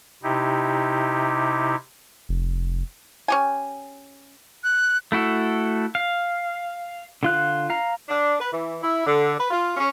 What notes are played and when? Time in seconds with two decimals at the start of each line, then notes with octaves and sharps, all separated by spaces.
0.23 C3 D#4 E4 G4
2.29 F1
3.28 C#4 G4 G#5
4.64 F#6
5.12 A3 E4 F#4 A4
5.95 F5
7.23 D3 F4 F#6
7.70 F5 A#5
8.09 D4
8.40 B4
8.52 E3
8.82 E4
9.06 D3
9.38 B4
9.50 F4
9.77 C#4